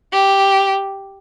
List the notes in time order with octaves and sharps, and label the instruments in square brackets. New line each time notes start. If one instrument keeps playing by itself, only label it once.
[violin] G4